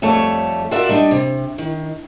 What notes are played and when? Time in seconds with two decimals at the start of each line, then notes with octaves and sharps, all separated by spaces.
0.02 F2 G3 A3 C#5 A5
0.71 F4 F#4 A#4 D5 E5
0.89 G3 D4 D#4
1.11 C3
1.58 D#3